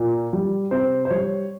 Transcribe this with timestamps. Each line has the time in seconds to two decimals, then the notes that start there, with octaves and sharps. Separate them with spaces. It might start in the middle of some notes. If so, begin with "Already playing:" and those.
Already playing: A#2
0.33 G3
0.71 C3 C5
1.05 C5
1.10 G3 C#5